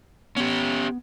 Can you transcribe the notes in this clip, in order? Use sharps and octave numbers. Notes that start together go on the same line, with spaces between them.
B3 C#4 G4